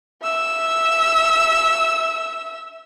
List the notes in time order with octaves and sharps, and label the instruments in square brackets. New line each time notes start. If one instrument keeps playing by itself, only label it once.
[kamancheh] E5 E6